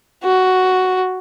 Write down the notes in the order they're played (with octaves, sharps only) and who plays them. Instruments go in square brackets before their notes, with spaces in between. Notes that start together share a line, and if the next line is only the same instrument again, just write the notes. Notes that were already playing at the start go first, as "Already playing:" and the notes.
[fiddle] F#4